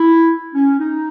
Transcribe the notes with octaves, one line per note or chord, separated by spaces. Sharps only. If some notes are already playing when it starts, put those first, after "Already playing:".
Already playing: E4
C#4
D#4